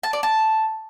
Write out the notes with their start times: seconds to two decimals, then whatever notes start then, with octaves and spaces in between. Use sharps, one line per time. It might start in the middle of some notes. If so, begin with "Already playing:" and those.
0.03 A5
0.13 D5
0.23 A5